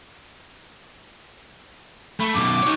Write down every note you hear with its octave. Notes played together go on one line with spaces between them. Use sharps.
A3 B5
F#2 B2 D6
D#4 C#5